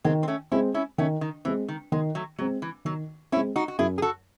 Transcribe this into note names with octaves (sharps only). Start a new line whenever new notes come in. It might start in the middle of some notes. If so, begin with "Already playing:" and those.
D#3 G#3 C4
C4
A3 C#4
G#3 C4 C#4 E4
C#4 E4
D#3 A3 C#4
D#3
E3 G#3 C4
D#3
D#3 G#3
F#3 A3
F#3 G#3 C4
E3
D#3 F#3
G#3 C4 C#4 E4
D#4 F#4
F#4
F#2 E4 G#4
G#4
F#4 A4